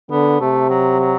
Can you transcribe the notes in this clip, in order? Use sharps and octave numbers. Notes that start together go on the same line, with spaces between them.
D3 B3
C3 A3
F#3
F#3